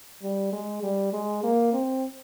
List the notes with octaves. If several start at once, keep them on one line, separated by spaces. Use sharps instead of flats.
G3
G#3
G3
G#3
A#3
C4